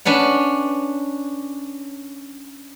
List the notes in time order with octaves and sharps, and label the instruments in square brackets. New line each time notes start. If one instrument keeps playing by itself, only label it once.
[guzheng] C#4 D4 B4 F#5